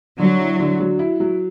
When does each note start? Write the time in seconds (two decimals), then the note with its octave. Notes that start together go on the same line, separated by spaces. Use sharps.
0.19 D3 F#3
0.39 E4
0.60 D3
0.80 F#3
0.99 E4
1.20 F#3